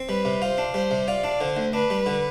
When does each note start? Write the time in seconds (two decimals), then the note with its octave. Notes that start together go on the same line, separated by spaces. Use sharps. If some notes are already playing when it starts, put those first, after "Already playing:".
Already playing: C4
0.09 G3 B4
0.25 C3
0.41 F4 C5
0.58 D4
0.74 G3 C5
0.91 C3
1.08 F4 D5
1.24 D4
1.41 D3 C5
1.57 D2
1.73 D4 B4
1.90 G3
2.06 D3